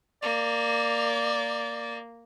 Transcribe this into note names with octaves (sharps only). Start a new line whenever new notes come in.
A#3 D5